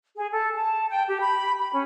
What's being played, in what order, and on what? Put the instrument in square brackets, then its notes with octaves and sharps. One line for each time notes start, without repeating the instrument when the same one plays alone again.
[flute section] G#4
A4
A5
G5
G4
B5
B5
C#4